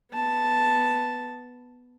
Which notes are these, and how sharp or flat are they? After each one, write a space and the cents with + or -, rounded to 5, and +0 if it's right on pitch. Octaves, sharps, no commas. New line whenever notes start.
B3 +0 A5 +0